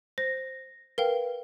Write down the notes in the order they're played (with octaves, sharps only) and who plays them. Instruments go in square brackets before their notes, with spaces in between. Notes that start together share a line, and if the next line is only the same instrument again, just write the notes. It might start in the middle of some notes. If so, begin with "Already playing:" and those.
[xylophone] C5 [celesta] A#6
[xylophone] A#4 F5 G5 [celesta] B4